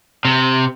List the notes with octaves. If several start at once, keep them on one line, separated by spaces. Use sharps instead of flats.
C3